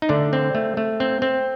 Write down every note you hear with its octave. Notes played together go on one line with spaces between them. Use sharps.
D#4
D3 A3 D4
C4
A3
A3
C4
C4